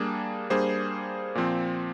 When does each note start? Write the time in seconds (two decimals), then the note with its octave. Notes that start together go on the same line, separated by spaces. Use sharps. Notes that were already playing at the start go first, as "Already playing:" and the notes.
Already playing: G3 A#3 D4 G#4
0.50 G3 A#3 D4 G#4 C5
1.35 A#2 F3 C4